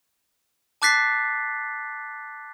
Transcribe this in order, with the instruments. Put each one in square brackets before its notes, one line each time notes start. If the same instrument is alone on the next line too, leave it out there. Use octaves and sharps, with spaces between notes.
[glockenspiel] A5 D6 F#6 A6 B6 C7